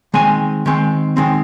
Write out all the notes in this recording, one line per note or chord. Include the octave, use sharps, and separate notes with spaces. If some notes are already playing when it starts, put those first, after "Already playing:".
D#3 G#3 C4 G#5
D#3 G#3 C4
D#3 G#3 C4